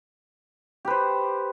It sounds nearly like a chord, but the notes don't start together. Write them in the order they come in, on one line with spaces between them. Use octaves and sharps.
G4 B4 C5